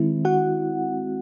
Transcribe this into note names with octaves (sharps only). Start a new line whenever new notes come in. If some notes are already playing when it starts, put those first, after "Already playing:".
Already playing: D#3 G#3 C4 E4
F#4 F#5